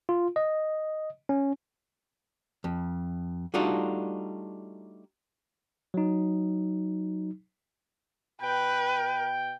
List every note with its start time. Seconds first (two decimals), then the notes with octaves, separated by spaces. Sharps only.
0.09 F4
0.36 D#5
1.29 C#4
2.64 F2
3.54 G3 A3 D4 D#4 F4 F#4
5.94 F#3 D#4
8.42 B2 B4 G5